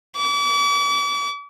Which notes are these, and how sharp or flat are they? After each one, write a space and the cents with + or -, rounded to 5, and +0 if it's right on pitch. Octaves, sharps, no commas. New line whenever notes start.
D6 -40